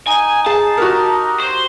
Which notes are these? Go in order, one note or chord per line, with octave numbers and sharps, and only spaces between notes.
D#4 G#5
G#4 A5
F#4 G4 A#4
C5